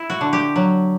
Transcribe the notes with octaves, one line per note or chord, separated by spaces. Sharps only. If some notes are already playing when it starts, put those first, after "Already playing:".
Already playing: E4
F#4
D3
G4
F#3